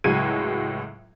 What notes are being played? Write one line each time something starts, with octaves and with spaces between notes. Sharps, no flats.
C#2 A2 F#3 G#3 G#6 D#7